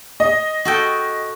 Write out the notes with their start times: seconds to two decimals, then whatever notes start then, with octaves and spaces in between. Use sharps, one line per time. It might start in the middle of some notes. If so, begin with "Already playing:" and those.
0.20 D#5
0.65 F#4 A4 G5